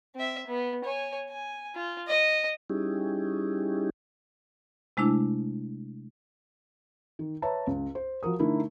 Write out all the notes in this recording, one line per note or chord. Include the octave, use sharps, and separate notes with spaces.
C4 E5
B3
C#5 G#5
G#5
F4
D#5
G3 C#4 D#4 E4 G4 G#4
C3 G#3 A3 D4 E4
D#3
B4 C#5 E5 A5 A#5
C#2
C5
F3 F#4 A#4 D#6
D3 A3 D#4 E4 A4 A#4